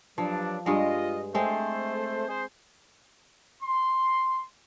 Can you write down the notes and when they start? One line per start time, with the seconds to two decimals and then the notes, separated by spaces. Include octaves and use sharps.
0.18 G2 F3 F#3 D4
0.66 G2 G#3 F4 D#5
1.35 G#3 A3 C4 C5
2.29 G#4 C5
3.63 C6